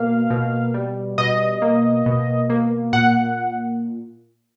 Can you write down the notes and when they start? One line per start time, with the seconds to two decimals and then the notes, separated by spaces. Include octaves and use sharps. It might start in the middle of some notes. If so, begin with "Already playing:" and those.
Already playing: B2 A#3 F5
0.30 B2
0.74 G3
1.18 B2 D#5
1.62 A#3
2.06 B2
2.50 A#3
2.93 A#2 F#5